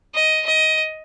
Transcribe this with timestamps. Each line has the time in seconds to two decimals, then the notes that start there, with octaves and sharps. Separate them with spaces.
0.15 D#5
0.46 D#5